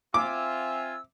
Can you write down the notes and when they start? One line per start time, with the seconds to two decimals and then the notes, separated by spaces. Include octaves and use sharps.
0.14 C4 F4 E5 G#5 D6 E6